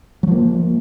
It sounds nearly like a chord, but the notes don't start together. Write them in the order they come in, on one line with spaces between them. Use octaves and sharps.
F#3 F3 A#3